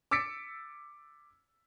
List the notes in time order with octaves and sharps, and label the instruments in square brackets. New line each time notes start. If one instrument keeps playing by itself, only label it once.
[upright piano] D6 E6 A6 B6 C#7 D7